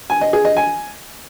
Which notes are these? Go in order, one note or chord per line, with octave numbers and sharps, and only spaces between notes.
G#5
D#5
G#4
D#5
G#5